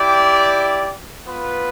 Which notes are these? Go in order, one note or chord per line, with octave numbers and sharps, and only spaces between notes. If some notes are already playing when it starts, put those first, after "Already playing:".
Already playing: E4 G4 D5 G5
B3 F4 B4